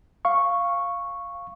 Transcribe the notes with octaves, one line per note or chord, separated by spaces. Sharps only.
F5 C#6